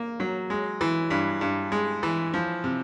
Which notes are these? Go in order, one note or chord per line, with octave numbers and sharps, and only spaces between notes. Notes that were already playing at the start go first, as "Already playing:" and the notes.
Already playing: A#3
F#3
G#3
E3
G2
G2
G#3
E3
F3
C3